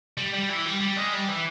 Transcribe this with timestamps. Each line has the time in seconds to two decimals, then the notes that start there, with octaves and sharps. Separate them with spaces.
0.17 G3
0.34 G3
0.49 E3
0.65 G3
0.81 G3
0.96 G#3
1.13 G3
1.29 E3